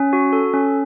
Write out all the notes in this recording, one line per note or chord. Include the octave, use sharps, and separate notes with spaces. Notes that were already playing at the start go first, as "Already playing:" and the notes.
Already playing: C#4
F#4
A4
C#4